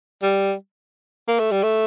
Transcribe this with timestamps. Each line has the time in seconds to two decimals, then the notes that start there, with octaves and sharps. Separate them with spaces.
0.22 G3
1.28 A#3
1.39 A3
1.52 G3
1.63 A3